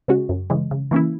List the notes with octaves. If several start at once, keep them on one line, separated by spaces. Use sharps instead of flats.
C#3 G#3 C#4 F#4
F#2
C#3 E3 G#3
C#3
E3 A#3 C#4 E4